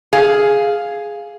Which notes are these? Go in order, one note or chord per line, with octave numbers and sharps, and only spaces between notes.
G#4 F5